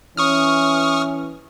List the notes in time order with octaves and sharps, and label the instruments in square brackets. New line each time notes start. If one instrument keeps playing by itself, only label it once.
[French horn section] E3 C#4 [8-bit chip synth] C#6 D#6 F6